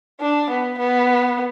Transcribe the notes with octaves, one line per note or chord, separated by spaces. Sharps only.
D4
B3
B3